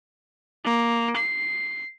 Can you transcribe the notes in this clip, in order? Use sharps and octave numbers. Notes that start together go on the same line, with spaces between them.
A#3
C7